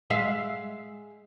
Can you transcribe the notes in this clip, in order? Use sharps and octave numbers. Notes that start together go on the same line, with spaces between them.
G#3 E5 F5